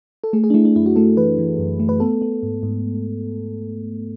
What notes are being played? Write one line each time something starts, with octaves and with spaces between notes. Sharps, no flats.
A4
A3 G#4
G#4
D4
A3 E4
D4
F#2 E4
F#4
A3 A4
E3 B4
E3
F#2
A3
B4
B3 A4
B3
G#2
G#2